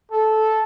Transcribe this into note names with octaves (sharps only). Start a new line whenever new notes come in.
A4